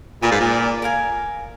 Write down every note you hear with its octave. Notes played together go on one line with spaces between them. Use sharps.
A#2 F4 G#4 B4 D5
G#2
A#2
A#4 F5 G#5